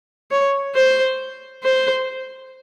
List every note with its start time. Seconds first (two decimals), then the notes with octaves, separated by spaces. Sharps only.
0.31 C#5
0.75 C5
1.64 C5